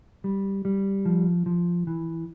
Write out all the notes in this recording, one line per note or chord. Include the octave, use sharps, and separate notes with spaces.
G3
G3
F3
F3
E3